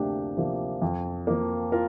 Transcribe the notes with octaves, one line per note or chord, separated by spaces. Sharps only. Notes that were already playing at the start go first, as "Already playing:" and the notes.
Already playing: D2 C3 F3 A#3 D4 G4
C3 F3 A#3
F2
F3 A#3
F4 A#4